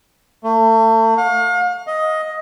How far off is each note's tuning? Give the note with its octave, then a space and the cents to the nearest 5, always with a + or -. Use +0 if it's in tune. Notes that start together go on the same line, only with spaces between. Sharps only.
A3 +35
F5 +40
D#5 +10